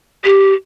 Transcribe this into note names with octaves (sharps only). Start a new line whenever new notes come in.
G4